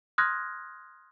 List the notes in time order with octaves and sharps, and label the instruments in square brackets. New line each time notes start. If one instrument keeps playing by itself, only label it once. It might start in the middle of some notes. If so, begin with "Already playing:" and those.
[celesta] C6 D#6 F6 F#6 G#6 A#6